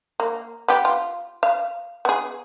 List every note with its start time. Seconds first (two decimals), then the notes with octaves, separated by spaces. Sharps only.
0.20 A#3
0.68 B3 G4
0.85 F4
1.43 F5
2.05 B3 G#4